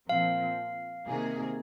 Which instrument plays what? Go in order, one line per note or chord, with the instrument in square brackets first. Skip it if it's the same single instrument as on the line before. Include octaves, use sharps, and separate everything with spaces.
[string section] A#2 F3 C4 [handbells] F5
[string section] C3 D#3 A#3 G#4